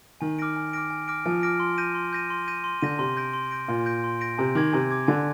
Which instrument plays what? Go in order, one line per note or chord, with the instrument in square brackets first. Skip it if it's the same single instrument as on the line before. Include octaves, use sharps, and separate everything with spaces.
[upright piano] D#3 [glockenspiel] G#5
[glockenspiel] D6 F6 A#6 D7
G#5
D6 F6 A#6 D7
G#5
D6 F6 A#6 D7
[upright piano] F3 [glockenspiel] G#5
[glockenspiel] D6 F6 A#6 D7
C6
G6 A#6 D#7
C6
G6 A#6 D#7
C6
G6 A#6 D#7
C6
[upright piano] D3 [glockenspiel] G6 A#6 D#7
[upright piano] C3 [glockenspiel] C6
[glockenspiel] G6 A#6 D7
C6
G6 A#6 D7
[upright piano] A#2 [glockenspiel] C6
[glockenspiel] G6 A#6 D7
C6
G6 A#6 D7
[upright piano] C3 [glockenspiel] G#5
[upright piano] D#3 [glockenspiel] D6 G#6
[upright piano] C3 [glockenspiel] G#5
[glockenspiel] D6 G#6
[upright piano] D3 [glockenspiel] G#5